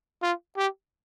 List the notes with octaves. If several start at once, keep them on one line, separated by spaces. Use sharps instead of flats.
F4
G4